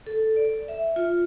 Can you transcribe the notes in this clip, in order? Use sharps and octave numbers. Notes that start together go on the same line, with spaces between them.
A4
D5
E5
F4